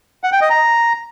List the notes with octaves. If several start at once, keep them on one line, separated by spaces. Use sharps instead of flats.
F#5
G5
D#5
A#5